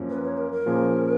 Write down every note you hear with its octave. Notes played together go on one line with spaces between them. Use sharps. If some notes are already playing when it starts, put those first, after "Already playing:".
Already playing: F#2 F3 A#3 C#4
B4
C#5
A#4
A#4
A#2 F3 A#3 C#4 G#4